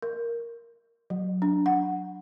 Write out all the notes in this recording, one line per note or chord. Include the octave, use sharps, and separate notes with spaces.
A#4
F#3
D4
F#5